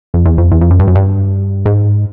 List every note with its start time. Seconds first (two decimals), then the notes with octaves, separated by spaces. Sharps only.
0.14 F2
0.25 E2
0.38 F2
0.51 E2
0.61 F2
0.71 F#2
0.79 G2
0.88 F#2
0.95 G2
1.66 G#2